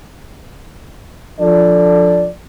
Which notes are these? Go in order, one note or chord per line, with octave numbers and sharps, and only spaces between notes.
F3 D4 A4 D5